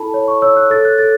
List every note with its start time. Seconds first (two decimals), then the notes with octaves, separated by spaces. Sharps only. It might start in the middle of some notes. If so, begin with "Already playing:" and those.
Already playing: E4 A4 A5 B5
0.14 C#5
0.28 C#6
0.42 C#5 E6
0.57 F#6
0.70 A4 A6
0.85 F#6
0.98 A4 A6